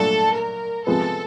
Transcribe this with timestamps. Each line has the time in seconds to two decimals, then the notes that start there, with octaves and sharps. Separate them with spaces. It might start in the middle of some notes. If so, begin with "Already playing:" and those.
Already playing: A#2 F#3 A3 D4 F4 A4
0.34 A#4
0.87 C3 F3 G#3 B3 A4